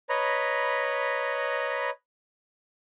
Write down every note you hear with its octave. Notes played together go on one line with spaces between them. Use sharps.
B4 C#5 D#5 A#5 B5